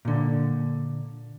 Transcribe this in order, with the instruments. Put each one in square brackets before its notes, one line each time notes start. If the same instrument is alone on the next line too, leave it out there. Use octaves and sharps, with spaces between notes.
[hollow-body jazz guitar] A#2 D3